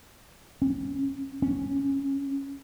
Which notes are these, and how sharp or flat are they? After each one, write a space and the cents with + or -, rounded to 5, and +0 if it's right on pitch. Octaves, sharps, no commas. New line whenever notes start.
C#4 -10
C#4 -5